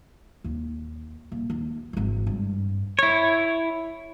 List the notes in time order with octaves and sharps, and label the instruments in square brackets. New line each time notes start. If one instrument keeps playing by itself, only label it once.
[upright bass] D#2
D#1
D#2
G#1 E3
G2
[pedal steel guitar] E4 C#5